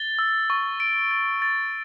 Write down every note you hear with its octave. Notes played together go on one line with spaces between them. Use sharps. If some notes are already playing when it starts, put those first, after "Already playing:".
Already playing: A6 G7
E6
C#6
D7
A6
A6